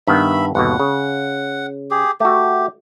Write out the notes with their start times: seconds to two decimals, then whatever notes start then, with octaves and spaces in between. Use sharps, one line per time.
0.07 G2 D#3 B3 E5 B5
0.55 G1 D#2 B2 F#5
0.80 C#3
1.91 G4 G#4
2.20 A3 F#4 G4